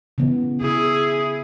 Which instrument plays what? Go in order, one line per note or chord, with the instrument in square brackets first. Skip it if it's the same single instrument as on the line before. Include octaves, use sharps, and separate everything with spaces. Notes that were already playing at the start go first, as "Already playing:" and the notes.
[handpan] C#3 E3 B3
[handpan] C#3 [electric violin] E4 G#4